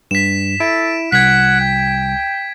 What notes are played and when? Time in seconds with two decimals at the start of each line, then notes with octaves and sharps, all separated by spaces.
0.11 G2 B6 E7
0.60 E4 A4 D7
1.12 C2 F#5 G#6 B6
1.60 G5